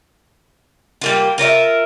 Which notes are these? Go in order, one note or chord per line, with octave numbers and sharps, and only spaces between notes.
G3 A#3 F4
F4 A#4 C#5 E5